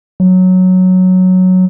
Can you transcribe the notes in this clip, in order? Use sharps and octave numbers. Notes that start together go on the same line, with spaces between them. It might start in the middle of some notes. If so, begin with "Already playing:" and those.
F#3